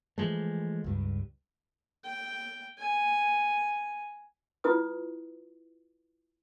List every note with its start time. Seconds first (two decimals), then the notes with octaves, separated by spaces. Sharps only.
0.18 E3 F3 G#3 A3
0.84 C#2 G2
2.04 G5
2.78 G#5
4.64 E4 F4 B4 D#6